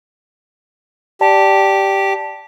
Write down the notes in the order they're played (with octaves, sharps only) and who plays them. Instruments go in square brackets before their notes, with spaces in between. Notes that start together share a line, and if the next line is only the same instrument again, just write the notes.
[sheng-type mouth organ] G4 [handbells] D5 A5